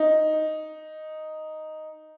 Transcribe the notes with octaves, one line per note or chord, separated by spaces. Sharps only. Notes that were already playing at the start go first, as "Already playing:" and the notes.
Already playing: D#4